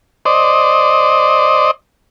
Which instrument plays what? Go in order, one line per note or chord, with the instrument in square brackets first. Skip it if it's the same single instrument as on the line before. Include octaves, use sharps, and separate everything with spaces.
[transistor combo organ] C5 D5 D#5